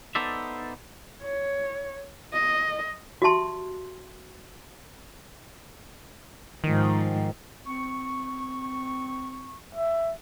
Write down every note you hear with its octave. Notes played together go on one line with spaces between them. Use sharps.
B3 D#4 A4 C5 D5 E5
C#5
D#5
F#4 G4 E5 A5 C6
G#2 D#3 F3
C4 C#6
E5